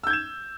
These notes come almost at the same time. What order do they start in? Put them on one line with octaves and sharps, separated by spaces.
E6 G6 G#6 E7